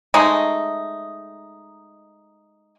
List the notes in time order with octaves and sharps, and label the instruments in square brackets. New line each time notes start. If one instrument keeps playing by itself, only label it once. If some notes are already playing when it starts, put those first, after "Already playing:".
[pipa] G#3 A3 D#4